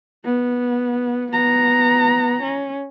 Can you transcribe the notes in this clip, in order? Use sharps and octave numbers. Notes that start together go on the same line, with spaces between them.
B3
B3 A#5
C#4